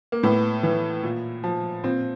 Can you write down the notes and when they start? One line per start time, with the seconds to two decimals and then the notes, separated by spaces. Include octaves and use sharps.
0.12 A#3
0.23 A2 B3
0.63 E3
1.03 A#2
1.44 F3
1.84 A#2 C4